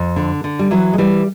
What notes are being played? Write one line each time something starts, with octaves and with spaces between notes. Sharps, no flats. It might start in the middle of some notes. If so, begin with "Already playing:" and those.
Already playing: F2
D3
D3
G3
E3 F#3
G#3
E3 G3